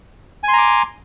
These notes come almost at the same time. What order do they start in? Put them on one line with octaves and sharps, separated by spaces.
G#5 C6 A#5 D6